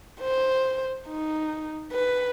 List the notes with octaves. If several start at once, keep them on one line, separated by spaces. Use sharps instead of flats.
C5
D#4
B4